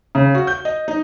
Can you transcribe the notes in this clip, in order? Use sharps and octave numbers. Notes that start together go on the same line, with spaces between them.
C#3
F#4
G6
D#5
D#4